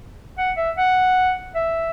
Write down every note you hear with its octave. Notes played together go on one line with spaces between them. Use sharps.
F#5
E5
F#5
E5